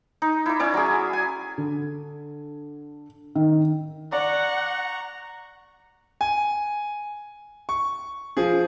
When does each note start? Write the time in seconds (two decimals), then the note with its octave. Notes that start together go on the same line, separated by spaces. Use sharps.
0.22 D#4
0.46 E4 D6
0.60 C#4 E4 D5
0.74 F#3 G#4
1.13 G#5
1.58 D3
3.35 D#3
4.12 D5 F#5 A#5 C#6
6.21 G#5
7.69 C#6
8.37 F3 G#4